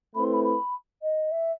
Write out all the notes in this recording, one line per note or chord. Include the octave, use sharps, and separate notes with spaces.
A3 C4 E4 B4 B5
C6
B5
B5
D#5
E5